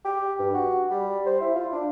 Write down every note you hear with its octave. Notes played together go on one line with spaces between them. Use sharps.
G4
G2
F#4
G3
C5
E4
F4
D4